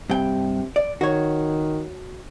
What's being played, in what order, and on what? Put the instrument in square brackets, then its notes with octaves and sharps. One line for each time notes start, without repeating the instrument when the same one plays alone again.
[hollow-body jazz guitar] G2 G5 [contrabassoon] C3
[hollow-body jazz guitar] D5
[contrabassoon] D#3 [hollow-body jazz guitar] F#4 C#5